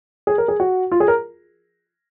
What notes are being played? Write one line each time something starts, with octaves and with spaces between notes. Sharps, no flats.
G#4
A#4
G#4
F#4
F4
G#4
A#4